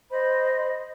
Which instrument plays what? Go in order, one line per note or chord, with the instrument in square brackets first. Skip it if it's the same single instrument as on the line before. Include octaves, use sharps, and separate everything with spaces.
[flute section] C5 D#5 B5